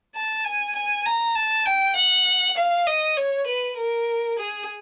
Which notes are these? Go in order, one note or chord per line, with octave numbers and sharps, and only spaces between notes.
A5
G#5
G#5
A#5
A5
G5
F#5
F5
D#5
C#5
B4
A#4
G#4